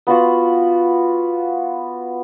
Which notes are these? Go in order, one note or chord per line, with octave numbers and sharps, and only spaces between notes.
B3 F4 F#4 F#5